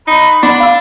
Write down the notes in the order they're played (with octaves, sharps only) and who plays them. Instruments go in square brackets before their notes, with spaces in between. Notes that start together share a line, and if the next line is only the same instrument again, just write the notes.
[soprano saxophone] D#4 [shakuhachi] B5
[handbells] B3 D#4 C6 [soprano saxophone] D4
[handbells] F5 E6